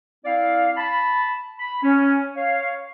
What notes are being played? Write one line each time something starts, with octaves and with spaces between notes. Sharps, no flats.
C4 E4 D5 F5
A5 B5
B5
C#4
C#5 F5